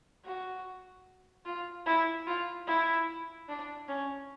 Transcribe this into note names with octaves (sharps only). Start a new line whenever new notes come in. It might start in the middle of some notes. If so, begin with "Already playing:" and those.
F#4
F4
E4
F4
E4
D4
C#4